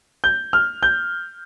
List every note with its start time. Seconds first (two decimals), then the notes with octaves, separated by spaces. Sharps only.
0.24 G6
0.53 F6
0.83 G6